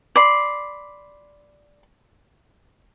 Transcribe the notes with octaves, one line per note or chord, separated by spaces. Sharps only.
D5 B5 C6